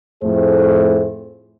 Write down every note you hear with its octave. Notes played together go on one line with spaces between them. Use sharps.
F2 A2 A3 G#4 C5